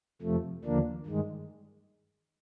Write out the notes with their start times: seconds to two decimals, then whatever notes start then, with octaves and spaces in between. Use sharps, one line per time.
0.22 F2 C3 F3 A3
0.64 D#2 D3 F3 A#3 D4
1.06 G2 D#3 G#3